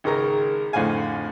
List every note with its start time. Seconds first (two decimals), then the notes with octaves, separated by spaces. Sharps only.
0.04 G#1 C#3 A#4 A#5
0.73 F2 A2 D3 C5 F5 G#5